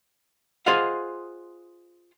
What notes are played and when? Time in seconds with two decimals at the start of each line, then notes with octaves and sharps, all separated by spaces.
0.66 F4 G#4 C5 D#5 F5 F#5